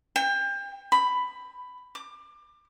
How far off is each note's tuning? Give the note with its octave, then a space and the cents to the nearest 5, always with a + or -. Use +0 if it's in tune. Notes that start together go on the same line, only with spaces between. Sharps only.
G5 +30
B5 +10
D6 +25